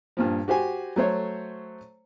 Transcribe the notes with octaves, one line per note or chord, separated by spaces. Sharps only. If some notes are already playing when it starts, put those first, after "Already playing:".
G2 A#2 F3
F#4 G4 C5 G#5
F#3 A3 C5 C#5